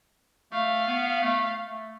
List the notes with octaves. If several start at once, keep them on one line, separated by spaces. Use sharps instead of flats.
A3 F5
B3
A3
A3